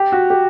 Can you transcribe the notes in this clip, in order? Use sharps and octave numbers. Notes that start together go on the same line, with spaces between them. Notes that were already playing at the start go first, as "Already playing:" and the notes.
Already playing: G4
F#4
G4